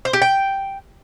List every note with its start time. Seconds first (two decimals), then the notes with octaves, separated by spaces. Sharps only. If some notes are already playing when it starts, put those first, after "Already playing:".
0.05 C5
0.13 G4
0.22 G5